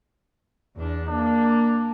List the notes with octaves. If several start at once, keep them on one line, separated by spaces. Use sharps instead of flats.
E2 D4
A#3 D4